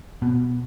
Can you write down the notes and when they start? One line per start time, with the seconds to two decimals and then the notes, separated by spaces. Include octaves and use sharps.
0.22 B2